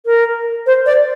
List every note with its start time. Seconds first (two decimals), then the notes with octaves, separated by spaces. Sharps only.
0.06 A#4
0.66 C5
0.86 D5